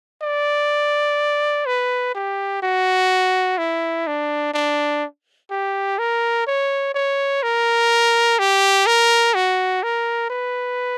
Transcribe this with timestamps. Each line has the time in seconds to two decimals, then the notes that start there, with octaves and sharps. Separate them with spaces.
0.22 D5
1.66 B4
2.15 G4
2.63 F#4
3.58 E4
4.07 D4
4.54 D4
5.51 G4
5.99 A#4
6.47 C#5
6.95 C#5
7.43 A#4
8.39 G4
8.86 A#4
9.34 F#4
9.83 A#4
10.30 B4